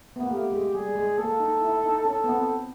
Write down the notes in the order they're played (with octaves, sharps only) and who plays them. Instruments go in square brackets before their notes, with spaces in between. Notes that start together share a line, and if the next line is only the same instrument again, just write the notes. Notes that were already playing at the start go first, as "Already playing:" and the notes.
[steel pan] B3
A#3
[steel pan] A3 [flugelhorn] G4
[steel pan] G#3
[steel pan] G3 [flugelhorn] G#4
[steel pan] G#3
[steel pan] A#3 [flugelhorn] A4
[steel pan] D#4
E4
D#4
[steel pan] C#4 [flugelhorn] A4
[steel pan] B3
C4